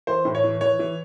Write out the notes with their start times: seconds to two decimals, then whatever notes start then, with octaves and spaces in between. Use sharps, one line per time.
0.07 E3 C5
0.25 A2
0.35 C#5
0.44 E3
0.61 E3 C#5
0.79 E3